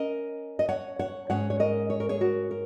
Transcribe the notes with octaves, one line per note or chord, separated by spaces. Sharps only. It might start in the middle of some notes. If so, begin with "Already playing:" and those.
Already playing: C#4 A#4 D#5
D#5
C#5 F#5
C#5 F#5
G#2 G#3 C#4 C#5 F#5
C#5
A#4 D#5
C#5
A#4
G#4 C#5
F#4 A#4
A#4